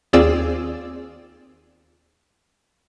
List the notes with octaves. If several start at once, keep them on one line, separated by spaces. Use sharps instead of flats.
D#2 C4 F4 G#4 D5 E6